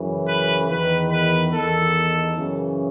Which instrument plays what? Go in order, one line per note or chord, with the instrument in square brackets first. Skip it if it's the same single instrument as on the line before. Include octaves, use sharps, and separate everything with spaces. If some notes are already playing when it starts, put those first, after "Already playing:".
Already playing: [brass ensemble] F#2 C#3 E3
B4
E2 D#3 B4
B4
E2 D#3 A4
F#2 C#3 E3